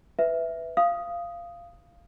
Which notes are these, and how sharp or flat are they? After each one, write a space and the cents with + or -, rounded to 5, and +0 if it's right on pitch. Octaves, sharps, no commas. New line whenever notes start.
B4 +10 E5 +0
F5 -15 D#6 +0